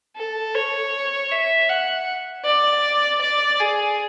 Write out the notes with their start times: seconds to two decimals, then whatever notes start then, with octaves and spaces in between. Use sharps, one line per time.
0.16 A4
0.55 C#5
1.31 E5
1.70 F#5
2.45 D5
3.21 D5
3.60 G#4